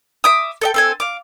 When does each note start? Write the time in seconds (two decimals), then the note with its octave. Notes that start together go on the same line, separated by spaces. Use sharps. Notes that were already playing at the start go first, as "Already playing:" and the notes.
0.24 E5 D6 D#6
0.61 A4 D#5 G5
0.74 C4 A4 G#5
1.00 F5 D6